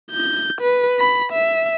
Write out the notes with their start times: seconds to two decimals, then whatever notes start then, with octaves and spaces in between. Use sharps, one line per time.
0.11 G6
0.61 B4
1.00 B5
1.32 E5